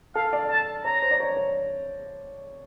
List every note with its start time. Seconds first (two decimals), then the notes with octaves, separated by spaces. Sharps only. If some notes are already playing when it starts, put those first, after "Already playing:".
0.15 A4 F5
0.33 D5
0.50 A5
0.85 C#5 A#5
1.02 C5
1.11 D5
1.20 C#5
1.37 C#5